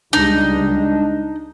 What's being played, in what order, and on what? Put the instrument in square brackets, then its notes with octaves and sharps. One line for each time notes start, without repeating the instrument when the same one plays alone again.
[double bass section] C#2 G3 G#3 [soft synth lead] D4 [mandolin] D#4